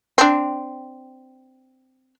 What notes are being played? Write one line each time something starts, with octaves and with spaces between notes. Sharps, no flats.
C4 D4